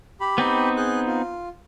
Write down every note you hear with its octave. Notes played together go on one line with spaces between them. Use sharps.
G4 B5
B3 C4 D#4
G#4 F#6
F4